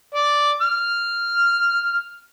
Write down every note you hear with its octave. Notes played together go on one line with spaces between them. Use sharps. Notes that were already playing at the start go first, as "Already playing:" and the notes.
D5
F6